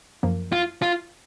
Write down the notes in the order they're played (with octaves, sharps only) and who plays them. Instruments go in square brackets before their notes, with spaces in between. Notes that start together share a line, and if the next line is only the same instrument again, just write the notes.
[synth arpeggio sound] F#2 F3 A#3
[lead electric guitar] F4
F4